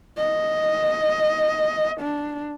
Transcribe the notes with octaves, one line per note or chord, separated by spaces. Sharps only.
D#5
D4